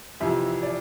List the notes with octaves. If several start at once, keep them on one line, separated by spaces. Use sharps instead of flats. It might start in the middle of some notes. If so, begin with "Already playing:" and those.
F2 C3 E3 E5
D5